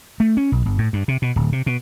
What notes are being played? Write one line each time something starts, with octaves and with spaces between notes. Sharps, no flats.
A3
C#4
B1
G1
A2
G2
C3
B2
D1
C3
B2